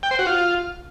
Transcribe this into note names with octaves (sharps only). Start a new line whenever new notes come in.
G5
C5
F#4
F4